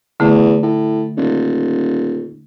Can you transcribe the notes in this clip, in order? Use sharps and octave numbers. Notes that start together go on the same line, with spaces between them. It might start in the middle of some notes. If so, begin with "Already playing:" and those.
E2 D3 A3
A2
D#1